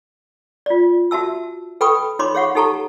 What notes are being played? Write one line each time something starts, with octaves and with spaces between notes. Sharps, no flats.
F4 D5
F#4 E5 A5 E6
A4 B4 G5 B5 C#6 D#6
D#4 C#5 B5 C6 D6
G#4 C#5 F5 F#5 C#6
D#4 G4 A4 A5 A#5 C#6